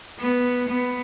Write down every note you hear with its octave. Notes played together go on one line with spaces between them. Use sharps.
B3
B3